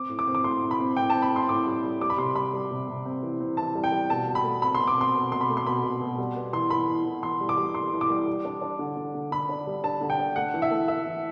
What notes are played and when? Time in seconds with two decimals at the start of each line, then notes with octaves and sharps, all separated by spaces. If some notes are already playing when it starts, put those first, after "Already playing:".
Already playing: C4 D6
0.09 A2
0.19 D6
0.27 C4
0.35 D6
0.44 A2 C6
0.62 C4
0.71 B5
0.80 C4
0.97 A2 G5
1.10 C4 A5
1.22 B5
1.31 A2
1.36 C6
1.49 A2 D6
1.66 G3
1.84 G3
2.01 G3 D6
2.10 B5
2.18 C3 C6
2.35 G3 B5
2.53 G3
2.71 C3
2.88 C3
3.06 C4
3.23 E3
3.40 C4
3.57 E3 A5
3.75 G3
3.84 G5
3.92 G3
4.10 B2 A5
4.27 B2
4.35 B5
4.44 A3
4.62 C4 B5
4.75 B2 C6
4.87 D6
4.97 C4 C6
5.15 B2
5.31 B2 C6
5.41 B5
5.49 A3
5.57 C6
5.66 B2 B5
5.83 B2
6.01 B2
6.18 G3
6.36 B3
6.53 E3 C6
6.70 E3 B5
6.88 E3
7.06 E3
7.23 E3 C6
7.41 G3
7.49 D6
7.57 G3
7.75 G3 C6
7.93 E3
8.01 D6
8.10 G3
8.27 G3
8.45 D4
8.62 D4
8.79 D3
8.97 D3
9.15 D3
9.32 D3 B5
9.49 D4
9.67 G3
9.84 D4 A5
10.01 D3
10.10 G5
10.19 D4
10.36 A3 F#5
10.54 E3
10.62 E5
10.71 A3
10.88 E3 E5
11.06 E3